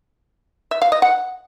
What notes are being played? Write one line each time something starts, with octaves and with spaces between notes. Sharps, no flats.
E5
F5
D#5
F#5